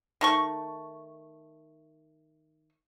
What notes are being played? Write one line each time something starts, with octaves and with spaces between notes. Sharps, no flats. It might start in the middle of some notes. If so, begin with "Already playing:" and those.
D#3 A3 C#6